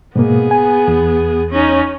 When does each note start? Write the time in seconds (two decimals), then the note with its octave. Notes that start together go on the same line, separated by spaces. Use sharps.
0.16 G#2 B2 A#3 B3 G#4
0.51 G#5
0.88 E2
1.50 C#4 D#4